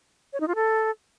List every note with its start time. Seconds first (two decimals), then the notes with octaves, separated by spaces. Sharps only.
0.33 C#5
0.40 D#4
0.48 F4
0.55 A4